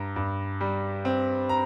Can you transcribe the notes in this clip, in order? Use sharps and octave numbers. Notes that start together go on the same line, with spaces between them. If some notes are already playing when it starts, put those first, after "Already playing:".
Already playing: G2 A#5
G2
G3
C4
A#5